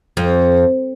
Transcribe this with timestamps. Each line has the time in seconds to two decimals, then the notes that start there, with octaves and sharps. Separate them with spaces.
0.17 F2